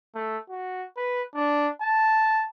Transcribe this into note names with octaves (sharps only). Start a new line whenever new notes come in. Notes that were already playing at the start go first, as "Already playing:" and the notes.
A3
F#4
B4
D4
A5